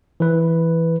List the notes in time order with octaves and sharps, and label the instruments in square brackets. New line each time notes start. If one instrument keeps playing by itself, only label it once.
[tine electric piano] E3 B4